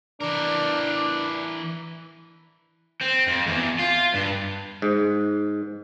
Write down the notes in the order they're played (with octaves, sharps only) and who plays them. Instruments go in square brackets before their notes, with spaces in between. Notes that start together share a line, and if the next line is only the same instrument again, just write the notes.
[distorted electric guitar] E3 A#4 [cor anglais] D4
[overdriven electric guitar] C4
F2
E2
F4
G2
[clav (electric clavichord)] G#2